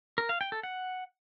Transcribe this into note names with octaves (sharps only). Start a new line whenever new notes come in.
A#4
F5
G5
A4
F#5